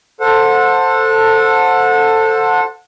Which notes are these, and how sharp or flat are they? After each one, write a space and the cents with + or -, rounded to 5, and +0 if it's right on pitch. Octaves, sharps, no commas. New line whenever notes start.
A4 +15 C5 +5 F#5 -25